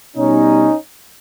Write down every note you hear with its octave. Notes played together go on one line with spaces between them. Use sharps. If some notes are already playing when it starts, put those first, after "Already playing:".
B2 G3 C#4 D#4